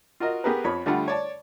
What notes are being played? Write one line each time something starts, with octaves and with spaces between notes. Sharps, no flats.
F4 F#4 A#4 D#5
B3 G4 G#4 A#4 B4
F2 F3 C#5 B5
D3 G3 A3 F4 F#5 B5
C#5 D5 A5